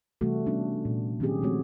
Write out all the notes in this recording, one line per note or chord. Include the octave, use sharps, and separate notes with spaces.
C3 E3 G3 A3 F#4 A4
G3 B3 C#4 D4
A#2
D#3 F#3 C4 C#4 G4 G#4
F3 G#3 A3 C4 F#4 C#5